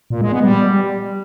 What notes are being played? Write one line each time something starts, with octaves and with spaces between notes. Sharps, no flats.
A#2
G#3
B3
G3